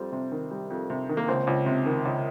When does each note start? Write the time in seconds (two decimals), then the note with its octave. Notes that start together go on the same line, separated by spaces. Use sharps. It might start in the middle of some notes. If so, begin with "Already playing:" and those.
Already playing: F2 G3 C4
0.12 C3
0.32 D#3
0.51 G3
0.70 F2
0.90 C3
1.09 D#3
1.17 A#3
1.28 C#2 C4
1.47 C#2
1.66 C3
1.86 D#3
2.05 C#2